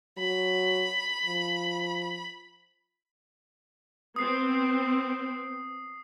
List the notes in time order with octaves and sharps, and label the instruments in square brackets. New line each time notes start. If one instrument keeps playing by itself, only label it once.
[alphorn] F#3 [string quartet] B5
[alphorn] F3
[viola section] B3 C4 [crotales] D#6 C7